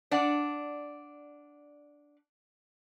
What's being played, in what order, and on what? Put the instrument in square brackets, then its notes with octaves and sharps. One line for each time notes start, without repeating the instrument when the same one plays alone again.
[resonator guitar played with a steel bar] D4 D5 F#5